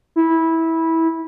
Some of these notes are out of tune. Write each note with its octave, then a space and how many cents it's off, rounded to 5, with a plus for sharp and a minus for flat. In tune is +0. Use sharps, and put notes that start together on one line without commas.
E4 -15